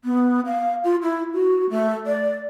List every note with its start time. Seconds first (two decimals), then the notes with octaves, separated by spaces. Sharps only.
0.05 B3
0.46 F5
0.84 F4
1.03 E4
1.33 F#4
1.70 A3
2.07 D5